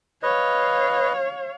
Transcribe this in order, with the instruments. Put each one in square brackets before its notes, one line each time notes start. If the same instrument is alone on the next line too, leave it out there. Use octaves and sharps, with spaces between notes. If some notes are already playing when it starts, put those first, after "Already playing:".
[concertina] B4 D#5 [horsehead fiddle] C#5 F5